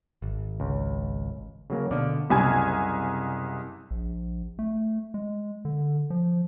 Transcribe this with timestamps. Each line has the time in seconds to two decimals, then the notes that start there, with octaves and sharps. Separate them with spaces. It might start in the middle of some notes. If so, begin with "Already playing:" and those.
0.22 G#1
0.60 C#2
1.70 C#3 F#3 A#3
1.91 B2 D3 D5 F5
2.30 F#1 C2 G#5 G#6
3.91 A#1
4.59 A3
5.14 G#3
5.65 D3
6.10 F3